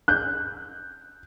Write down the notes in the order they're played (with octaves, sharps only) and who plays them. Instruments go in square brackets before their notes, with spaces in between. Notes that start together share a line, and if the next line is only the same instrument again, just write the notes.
[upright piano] F#6 G6